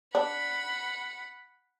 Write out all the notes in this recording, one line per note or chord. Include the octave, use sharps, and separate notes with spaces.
D4 F#5 B5